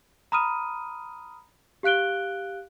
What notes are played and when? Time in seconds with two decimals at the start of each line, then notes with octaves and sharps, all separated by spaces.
0.32 A#5 B5 D#6 F6 D#7
1.83 G4 F5 F#6 D7 G7